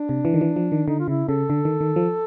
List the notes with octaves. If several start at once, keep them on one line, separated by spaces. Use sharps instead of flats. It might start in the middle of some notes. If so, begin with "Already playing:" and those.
Already playing: D4
C3
E3
D#3
E3
F3
D#3
D3 D#4
F4
C#3 E4
C#3 A4
D3
D#3
D#3
F3